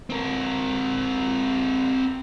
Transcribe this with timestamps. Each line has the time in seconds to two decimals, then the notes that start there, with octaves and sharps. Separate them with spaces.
0.10 C4 A#4